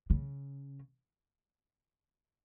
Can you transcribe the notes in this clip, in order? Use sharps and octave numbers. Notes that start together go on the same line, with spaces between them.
C#3